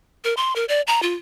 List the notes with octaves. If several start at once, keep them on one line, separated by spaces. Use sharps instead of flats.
A#4
C6
A#4
D5
A#5
F4